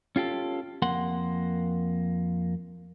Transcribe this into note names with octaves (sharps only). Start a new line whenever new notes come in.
C#4 F4 G4 A4
F2 A#3 F#5 C6